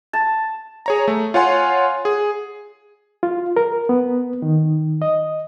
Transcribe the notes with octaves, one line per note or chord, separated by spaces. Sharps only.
A5
G#4 C#5 A#5
A3
F4 C#5 F#5 G#5 C6
G#4
F4
A#4
B3
D#3
D#5